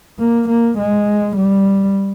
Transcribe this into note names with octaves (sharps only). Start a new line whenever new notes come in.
A#3
A#3
G#3
G3